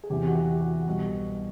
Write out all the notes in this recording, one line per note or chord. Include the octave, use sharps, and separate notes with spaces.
G#4
E2 C3 E3 G4
F#4
G4
F#4
C2 B2 G3 B3 F#4